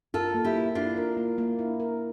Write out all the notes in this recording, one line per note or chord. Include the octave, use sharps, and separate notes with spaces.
F4 A4 A#4
A#3
E4 G4
A#3
D4 E4 F4
A#4
A#3
A#3
E4
A#4